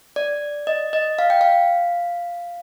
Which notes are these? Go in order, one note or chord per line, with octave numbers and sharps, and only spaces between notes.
D5
D#5
D#5
F5
G5
F5